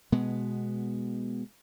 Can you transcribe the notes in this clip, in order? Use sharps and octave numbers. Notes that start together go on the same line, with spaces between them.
B2 G#3 B3